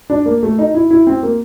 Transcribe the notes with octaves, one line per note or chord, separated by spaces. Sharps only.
D4
A#3
A3
D#4
E4
E4
C4
A#3